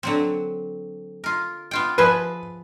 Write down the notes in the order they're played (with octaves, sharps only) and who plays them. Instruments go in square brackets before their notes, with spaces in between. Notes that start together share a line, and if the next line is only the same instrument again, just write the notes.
[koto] D3 F#3 C4
F4 A#4
B3 F4 G5
[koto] F3 G#4 E5 [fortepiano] B4